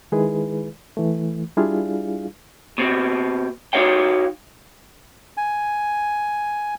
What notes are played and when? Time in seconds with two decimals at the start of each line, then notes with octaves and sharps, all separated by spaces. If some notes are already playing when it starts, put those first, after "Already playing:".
0.12 D#3 G#3 E4 G#4 B4
0.97 E3 A3
1.57 G3 D4 E4 F4 G#4 F5
2.78 B2 C4
3.73 D#4 E4 F#4 C#5 F5 G5
5.37 G#5